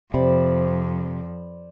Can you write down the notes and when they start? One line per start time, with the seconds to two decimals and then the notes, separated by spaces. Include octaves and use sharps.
0.14 F2 C3 C5 D5 B5